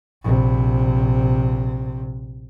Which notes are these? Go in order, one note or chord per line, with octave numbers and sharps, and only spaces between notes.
A#1 C3